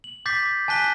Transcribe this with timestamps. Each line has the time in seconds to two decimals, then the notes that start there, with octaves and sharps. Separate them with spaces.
0.04 F#7
0.26 D6 G6 A6 B6 C7
0.68 G#5 A5 F#6 B6 G7